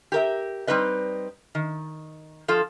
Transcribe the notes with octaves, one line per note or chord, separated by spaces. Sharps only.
G4 A#4 E5
G3 C4 D#4 B4 D#5
D#3
F3 F4 A4